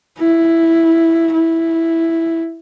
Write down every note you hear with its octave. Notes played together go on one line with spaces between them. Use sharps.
E4
E4